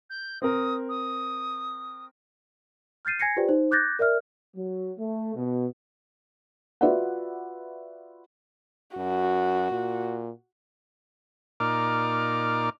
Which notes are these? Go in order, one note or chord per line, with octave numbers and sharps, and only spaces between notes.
G6
C4 A#4 D#6
D#6
F6 G6 A6 C7 D#7
G#5 G#6 A#6 C7 C#7
F4 G4 B4 C5 D5 G5
D#4 C5
D6 F#6 G6 A6 A#6
A#4 D5 E5 F6
F#3
A3
B2
F4 F#4 B4 D5 E5 F#5
F#2 F#4
A#2
A#2 D#4 A#4 D5 D6 F6